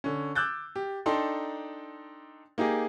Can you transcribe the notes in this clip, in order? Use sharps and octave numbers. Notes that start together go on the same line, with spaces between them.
D3 C#4
D6 E6 F#6 G6 A6
G4
D4 D#4 A4 G5 C6
A#3 D#4 G4 G#4